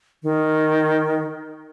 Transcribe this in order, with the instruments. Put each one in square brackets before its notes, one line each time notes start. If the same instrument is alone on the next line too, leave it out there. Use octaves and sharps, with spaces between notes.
[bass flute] D#3